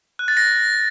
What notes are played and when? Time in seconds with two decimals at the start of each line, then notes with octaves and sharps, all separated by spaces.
0.19 F#6
0.28 A6
0.37 A#6